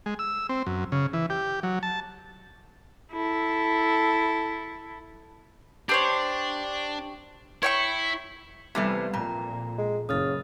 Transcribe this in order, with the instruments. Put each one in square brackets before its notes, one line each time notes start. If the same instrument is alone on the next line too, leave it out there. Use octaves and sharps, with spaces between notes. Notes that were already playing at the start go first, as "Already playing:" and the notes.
[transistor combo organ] G#3
E6
C4
F#2
C#3
E3
G4
F#3
A5
[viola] E4 A4
[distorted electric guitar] D4 [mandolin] G4 C5 C#5
[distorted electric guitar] E4 [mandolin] C#5 G5 C#6
[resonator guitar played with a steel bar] C3 E3 A3 [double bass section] G3 [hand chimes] B3 G4 B4
[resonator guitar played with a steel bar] F2 [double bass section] A#2 [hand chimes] A#5
[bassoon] G#3
[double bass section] F#1 [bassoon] C#3 [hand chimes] D#6 F6 A6